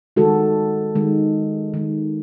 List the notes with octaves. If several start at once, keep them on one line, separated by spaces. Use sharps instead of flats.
D#3 G#3 F#4 A4
D#3 G#3
D#3 G#3